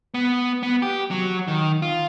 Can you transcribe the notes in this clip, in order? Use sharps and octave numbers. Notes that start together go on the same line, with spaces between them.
B3
B3
G4
F#3
D#3
F4